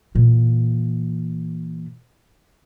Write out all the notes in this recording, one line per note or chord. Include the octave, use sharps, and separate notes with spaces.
A#2 E3